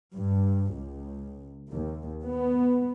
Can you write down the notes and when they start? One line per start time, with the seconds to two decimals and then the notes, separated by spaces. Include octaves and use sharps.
0.15 G2
0.75 C#2
1.72 D#2
2.22 B3